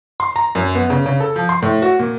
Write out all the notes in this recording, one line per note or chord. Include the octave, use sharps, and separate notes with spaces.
C6
A#5
F#2
B3
C#3
C#3
A4
F3
C6
A2
F#4
A#2